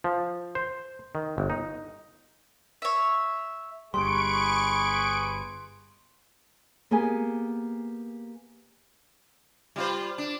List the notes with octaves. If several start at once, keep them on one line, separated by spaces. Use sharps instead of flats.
F3
C5
D#3
G1
D#4
C#5 E5
G1 G3 G#4 B4 C6 C#6 D7
A#3 B3 G4 G#4 G#5
G3 F4 C5
D4